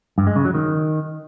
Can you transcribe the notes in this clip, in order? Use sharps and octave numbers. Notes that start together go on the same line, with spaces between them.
G2
G#3
C#3
F#3
D#3